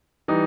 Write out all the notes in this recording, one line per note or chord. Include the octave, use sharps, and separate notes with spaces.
E3 G3 D#4